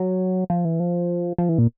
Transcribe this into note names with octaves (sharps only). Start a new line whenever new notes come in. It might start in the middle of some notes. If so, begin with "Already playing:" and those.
Already playing: F#3
F3
E3
F3
F3
E3
A#2